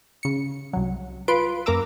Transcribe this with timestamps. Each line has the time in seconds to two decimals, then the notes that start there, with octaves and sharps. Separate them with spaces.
0.23 C#3 C#7
0.73 C2 F#3
1.28 F4 B4 C6 D7
1.66 F#2 A#3 A#4 A#5 D6 E6